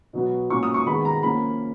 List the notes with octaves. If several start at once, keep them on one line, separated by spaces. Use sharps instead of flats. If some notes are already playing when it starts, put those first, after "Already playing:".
B2 F#3 B3
A#2 F#3 C#4 C#6
D#6
C#6
D#3 G#3 B3 B5
A#5
F3 A#3 C#4 B5